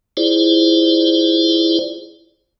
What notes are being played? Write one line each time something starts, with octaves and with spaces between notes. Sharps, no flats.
E4 F4 G#4 C5 D5